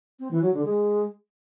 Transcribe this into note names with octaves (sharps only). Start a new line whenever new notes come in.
C4
E3
F#3
D3
G#3